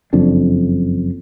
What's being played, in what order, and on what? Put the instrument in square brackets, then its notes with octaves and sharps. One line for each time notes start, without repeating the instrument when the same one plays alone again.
[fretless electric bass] F#1 F2 D4